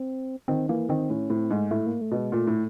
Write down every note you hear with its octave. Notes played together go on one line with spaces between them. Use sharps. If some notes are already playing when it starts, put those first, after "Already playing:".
Already playing: C4
D#3 C4
E3 A#3
D#3 C4
A2 C#4
A2 C4
G#2 A3
A2 A3
A#3
A3
B2
G#3
A#2 A3
A2